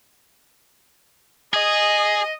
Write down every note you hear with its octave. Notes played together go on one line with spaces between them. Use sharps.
G#4 D#5